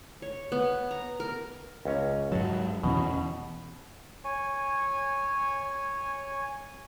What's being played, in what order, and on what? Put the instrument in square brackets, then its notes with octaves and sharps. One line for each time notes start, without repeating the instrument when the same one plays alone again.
[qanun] C#5
B3
A#5
A#4
[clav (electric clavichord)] C#2 C#4 A#5
[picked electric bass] G#2 F#3 [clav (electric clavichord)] F#5 A5
[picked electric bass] E2 E3 C#4 [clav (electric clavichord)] B2
[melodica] C#5 G#5